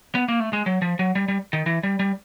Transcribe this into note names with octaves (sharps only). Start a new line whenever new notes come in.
B3
A#3
A3
G#3
F#3
F3
F#3
G3
G3
D#3
E3
G3
G3